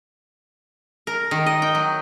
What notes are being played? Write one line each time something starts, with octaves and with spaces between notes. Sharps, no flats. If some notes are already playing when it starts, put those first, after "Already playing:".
A#4
D#3
D#5
G5
F#3